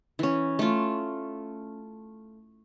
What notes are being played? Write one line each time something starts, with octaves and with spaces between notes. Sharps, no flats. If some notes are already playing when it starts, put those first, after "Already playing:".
E3 C#4
A3 F4